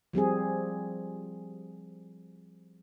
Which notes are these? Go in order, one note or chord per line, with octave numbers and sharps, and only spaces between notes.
F3 G3 C4 G#4